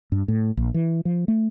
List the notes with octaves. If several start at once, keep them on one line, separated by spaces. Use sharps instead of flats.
G2
A2
A#1
E3
F3
A3